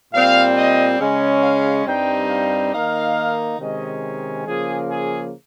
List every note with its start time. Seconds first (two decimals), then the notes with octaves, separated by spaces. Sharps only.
0.14 A#2 G3 C4 F5
0.56 D#5
1.00 C#3 G#3 C#4
1.43 F5
1.86 G2 G3 C4 D#4 G5
2.29 F5
2.73 D#3 A#3 D#4 F5
3.59 C3 D#3 G#3 C#4 D#5
4.46 C#3 F3 A#3 G#4
4.89 G#4